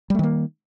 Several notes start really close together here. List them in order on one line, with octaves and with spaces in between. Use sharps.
G3 A3 D#3 A#3